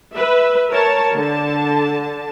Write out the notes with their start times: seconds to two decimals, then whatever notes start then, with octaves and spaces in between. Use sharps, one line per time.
0.15 B4 E5
0.71 A#4 C#5 A5
1.14 D3 A5